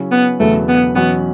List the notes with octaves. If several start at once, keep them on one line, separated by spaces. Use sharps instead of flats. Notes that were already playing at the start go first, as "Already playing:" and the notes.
Already playing: C#3 F#3 C#4 E4
B3
E1 E2 C#3 F#3 A3 B3
B3
E2 B2 F#3 B3 C#4 F#4